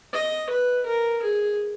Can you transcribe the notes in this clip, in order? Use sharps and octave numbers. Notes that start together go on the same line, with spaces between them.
D#5
B4
A#4
G#4